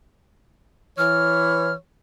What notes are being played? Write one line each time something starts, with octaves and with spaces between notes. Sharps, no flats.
E3 C#5 F6